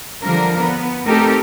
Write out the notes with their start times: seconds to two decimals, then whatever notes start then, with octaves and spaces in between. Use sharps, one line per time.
0.24 D3 F3 G3 A#4
0.58 B3
1.06 A3 C4 D#4 G4 A4 A#4